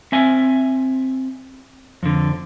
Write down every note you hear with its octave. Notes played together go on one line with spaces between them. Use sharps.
C4 E5 G#5
F2 D3